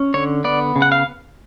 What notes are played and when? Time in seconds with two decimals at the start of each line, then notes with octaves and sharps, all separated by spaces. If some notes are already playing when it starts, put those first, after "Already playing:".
Already playing: C#4
0.14 D3 C#5
0.44 B3 D5
0.76 C#3
0.82 F#5
0.92 F5